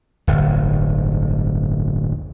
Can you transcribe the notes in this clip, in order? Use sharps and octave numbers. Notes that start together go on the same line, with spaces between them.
D1 G1